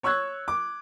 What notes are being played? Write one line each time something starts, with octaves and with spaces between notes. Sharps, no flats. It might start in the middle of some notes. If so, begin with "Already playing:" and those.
C#5 C#6 E6 F#6 G#6
D6